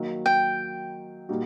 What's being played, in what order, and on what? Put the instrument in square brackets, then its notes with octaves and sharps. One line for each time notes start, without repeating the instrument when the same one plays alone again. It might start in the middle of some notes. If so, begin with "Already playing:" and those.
Already playing: [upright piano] D#3 F#3 A#3
[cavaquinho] G5
[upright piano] A#2 G3 A#3 D#4 F#4